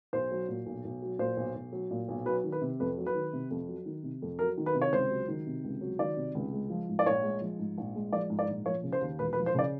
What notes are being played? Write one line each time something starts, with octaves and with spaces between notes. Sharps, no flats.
B1 C5
F#3
A#2
B1
B1
F#3
A#2 C5
B1
B1
F#3
A#2
B1
F#3 B4
D#3
B4
C3
F2 B4
F#3
B4
D#3
C3
F2
F#3
D#3
C3
F2
F#3 A#4
D#3
B4
C3
C#5
C#2 C5
F#3
D#3
C3
C#2
F#3
D#3 D5
C3
C#2
G#3
F3
G#2
D5
A#1 C#5
G#3
F3
G#2
A#1
G#3
F3 D5
G#2
D5
A#1
F3 C#5
C#3
C5
D#2
E1 B4
B4
F3
C5
C#3 D5